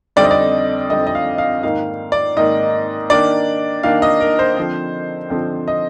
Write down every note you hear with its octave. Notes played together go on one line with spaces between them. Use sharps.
F2 D3 G3 C4 D#4 D5
D#5
D5
F2 D3 G3 C4 D#4 D#5
D#5
F5
F5
G#2 D#3 A#3 F5
D5
G#2 D#3 A#3 D#5
D#3 A#3 D4 D5
D#3 A#3 D4 F5
D#5
A#4
C5
D3 F3 C4
D3 F3 C4
D#5